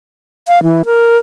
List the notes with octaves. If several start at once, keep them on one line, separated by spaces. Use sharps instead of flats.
F5
E3
A#4